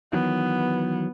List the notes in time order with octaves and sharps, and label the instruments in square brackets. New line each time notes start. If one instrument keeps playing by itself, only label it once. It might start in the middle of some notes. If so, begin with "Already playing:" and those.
[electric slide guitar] D#3 E3 F#3 [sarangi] B3